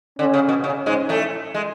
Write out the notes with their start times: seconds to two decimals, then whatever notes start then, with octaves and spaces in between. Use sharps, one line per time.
0.19 D3 C#4
0.34 C#3
0.49 B2
0.64 C#3
0.86 G#2 G#3
1.09 A2 A3
1.54 G#3